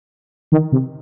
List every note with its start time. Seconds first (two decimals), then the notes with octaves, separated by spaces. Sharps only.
0.52 D#3
0.72 C3